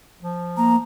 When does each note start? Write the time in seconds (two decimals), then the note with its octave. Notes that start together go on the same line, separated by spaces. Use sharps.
0.21 F3
0.57 A#3 A#5